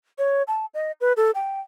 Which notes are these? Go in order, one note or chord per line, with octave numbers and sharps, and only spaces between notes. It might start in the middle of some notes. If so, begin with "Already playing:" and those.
C#5
A5
D#5
B4
A4
G5